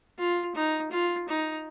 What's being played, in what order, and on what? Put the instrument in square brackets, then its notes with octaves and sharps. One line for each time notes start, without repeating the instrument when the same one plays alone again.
[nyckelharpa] F4
D#4
F4
D#4